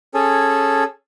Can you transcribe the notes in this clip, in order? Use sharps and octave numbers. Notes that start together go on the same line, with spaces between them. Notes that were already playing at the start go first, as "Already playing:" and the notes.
C#4 G#4 A4